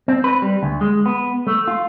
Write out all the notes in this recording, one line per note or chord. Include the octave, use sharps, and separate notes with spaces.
C4
B4
G3
D2
G#3
B3
A3
F4